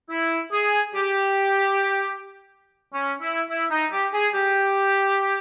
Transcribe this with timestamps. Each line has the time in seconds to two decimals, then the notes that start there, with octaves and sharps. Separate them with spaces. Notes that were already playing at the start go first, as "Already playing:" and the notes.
0.09 E4
0.52 G#4
0.95 G4
2.93 C#4
3.21 E4
3.49 E4
3.71 D#4
3.91 G4
4.13 G#4
4.34 G4